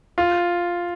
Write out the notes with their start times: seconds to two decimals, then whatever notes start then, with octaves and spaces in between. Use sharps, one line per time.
0.18 F4